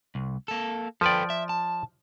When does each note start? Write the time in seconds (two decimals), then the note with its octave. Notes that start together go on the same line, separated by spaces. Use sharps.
0.15 C2
0.48 A#3 A4
1.01 F3 A4 B4 D5 G5
1.30 E5
1.49 A5